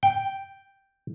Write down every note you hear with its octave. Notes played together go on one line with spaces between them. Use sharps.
G5